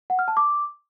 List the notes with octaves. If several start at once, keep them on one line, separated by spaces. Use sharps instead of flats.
F#5
F6
A5
D6